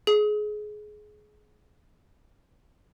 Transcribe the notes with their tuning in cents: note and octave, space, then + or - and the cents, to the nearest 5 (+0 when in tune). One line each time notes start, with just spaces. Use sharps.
G#4 +20